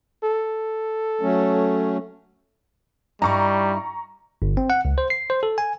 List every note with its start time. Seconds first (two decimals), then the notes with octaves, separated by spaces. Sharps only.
0.24 A4
1.21 F#3 A3 C#4
3.22 G2 G3 D#4 E4 A#5 C#6
4.42 G1
4.57 C4
4.70 F#5
4.85 C#2
4.98 C5
5.10 C7
5.30 C5
5.43 A4
5.58 G#5